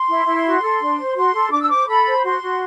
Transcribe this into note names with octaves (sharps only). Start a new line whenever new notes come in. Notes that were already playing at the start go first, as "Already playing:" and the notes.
Already playing: C6
E4
E4
F#4
A4
D4
C5
F#4 C6
A4
D4 D6
E6
C5 D6
A4 B5
C5
F#4 C6
F#4